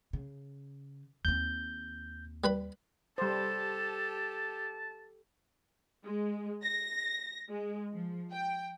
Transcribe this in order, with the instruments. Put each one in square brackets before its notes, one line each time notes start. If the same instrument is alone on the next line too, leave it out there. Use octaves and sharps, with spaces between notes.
[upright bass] C#3
[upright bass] D#2 C4 [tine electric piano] G6
[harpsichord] G3 B4 B5
[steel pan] G3 C5 [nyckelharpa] G4 A4 [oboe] A5
[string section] G#3
A#6
G#3
F3
G5